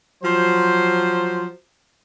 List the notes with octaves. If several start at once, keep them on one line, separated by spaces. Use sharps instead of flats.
F3 F#3 C5